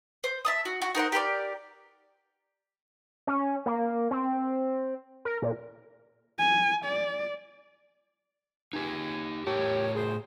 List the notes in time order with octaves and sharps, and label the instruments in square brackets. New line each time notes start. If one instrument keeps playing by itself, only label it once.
[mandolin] C5
E5 A5 D#6
F#4
F#4
D#4 A#4 C5 F#5
G4 A#4 B4 D5
[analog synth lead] C#4
A#3
C4
A#4
A#2
[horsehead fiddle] G#5
D5
[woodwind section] C#2 C4 G#5 [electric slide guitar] D#4 G4
[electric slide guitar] A2 A#4 A5 [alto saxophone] G4 [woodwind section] C#5
[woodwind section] F#2 C5 [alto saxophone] G#4